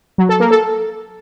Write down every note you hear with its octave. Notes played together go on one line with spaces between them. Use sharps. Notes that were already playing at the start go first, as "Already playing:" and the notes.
F#3
A4
A#3
A4